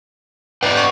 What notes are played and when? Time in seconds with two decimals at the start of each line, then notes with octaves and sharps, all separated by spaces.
0.63 B4 D5 F#5 G5
0.77 C#6